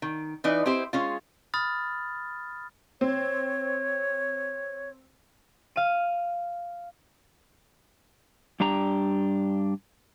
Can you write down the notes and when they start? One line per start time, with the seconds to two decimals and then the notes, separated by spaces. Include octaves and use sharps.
0.02 D#3
0.44 E3 D#4 B4 D5
0.66 C4 E4 G4 C5
0.93 G#3 C#4 F4
1.54 B5 D#6 F6 A6
3.01 C4 C#5
5.76 F5 F6 D#7
8.60 G2 D4 G4 A#5